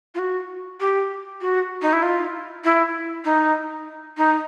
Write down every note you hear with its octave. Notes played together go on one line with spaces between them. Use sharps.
F4
F#4
G4
F#4
D#4
E4
F4
E4
D#4
D#4